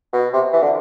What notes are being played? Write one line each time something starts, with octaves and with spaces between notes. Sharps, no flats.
B2
C3
E3
D3